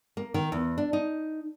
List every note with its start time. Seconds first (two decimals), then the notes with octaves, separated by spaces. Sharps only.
0.17 A#3
0.34 D#3
0.52 E2
0.78 D4
0.93 D#4